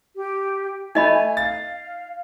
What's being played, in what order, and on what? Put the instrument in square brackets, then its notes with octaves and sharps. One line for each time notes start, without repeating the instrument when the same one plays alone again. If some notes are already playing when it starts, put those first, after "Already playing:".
[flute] G4
[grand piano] A3 [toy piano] D#4 D#5 B5 [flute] G#5
[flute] F5 [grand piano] A6